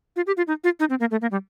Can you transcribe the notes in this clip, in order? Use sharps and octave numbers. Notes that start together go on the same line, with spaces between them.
F4
G4
F4
D#4
F4
D#4
C4
A#3
A3
A#3
G3